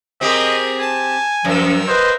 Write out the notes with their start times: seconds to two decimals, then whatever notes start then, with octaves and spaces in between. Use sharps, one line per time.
0.21 C4 G4 G#4 A#4 D#5
0.81 G#5 A5
1.45 F#2 F3 A#4 E6
1.88 B4 C5 D#5